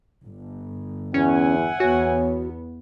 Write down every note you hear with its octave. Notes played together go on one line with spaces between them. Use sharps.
G1
E2 C#4 E5 F#5 G#5
E2 B3 F#4 C#5